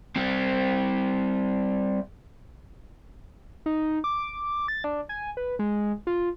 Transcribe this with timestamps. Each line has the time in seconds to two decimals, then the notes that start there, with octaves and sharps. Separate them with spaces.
0.16 G3 C4
3.66 D#4
4.04 D6
4.68 A6
4.84 D4
5.09 G#5
5.37 B4
5.59 G#3
6.07 F4